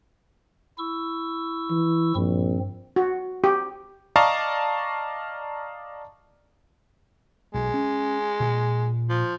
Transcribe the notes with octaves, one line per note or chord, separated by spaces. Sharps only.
E4 C#6 E6
E3
A#1 G2 F3 C4
F#4
G4
D5 D#5 F5 A5 A#5 C#6
B1 G#3
C#4
A#2
F3